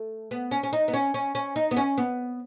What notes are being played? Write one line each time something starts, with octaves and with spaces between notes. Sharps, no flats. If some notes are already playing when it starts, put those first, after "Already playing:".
Already playing: A3
B3
C#4
C#4
D#4
B3
C#4
C#4
C#4
D#4
B3
C#4
B3